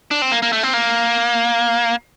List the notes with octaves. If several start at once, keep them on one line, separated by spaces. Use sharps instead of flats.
D4
C4
A#3
A#3
A3
C4
A#3